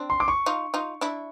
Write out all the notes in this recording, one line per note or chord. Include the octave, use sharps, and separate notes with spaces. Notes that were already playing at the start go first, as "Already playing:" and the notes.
Already playing: C4 D4
C6
D6
C#6
D#4 F4
D#4 F4
D4 E4